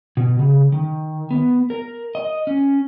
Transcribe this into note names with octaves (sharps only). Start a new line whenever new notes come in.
B2
C#3
D#3
B3
A#4
D#5
C#4